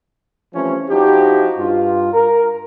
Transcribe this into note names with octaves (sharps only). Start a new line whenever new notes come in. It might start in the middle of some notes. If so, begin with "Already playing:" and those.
E3 F3 G3 A3 C4 C#4
F3 D#4 E4 F#4 G4
G2 F4
A#4